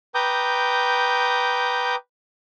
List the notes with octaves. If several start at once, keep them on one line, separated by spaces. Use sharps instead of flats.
B4 G5 A#5 D6 D#6 G6